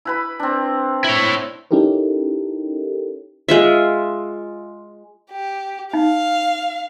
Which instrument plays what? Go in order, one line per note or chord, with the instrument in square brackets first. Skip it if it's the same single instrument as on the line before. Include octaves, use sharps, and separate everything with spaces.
[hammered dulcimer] E4 B4 B5
C4 D4
[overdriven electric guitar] E4 C#5
[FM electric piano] C#4 D#4 E4 G4 A4 A#4
[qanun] G#3 F4 E5
[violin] G4
[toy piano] D#4 [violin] F5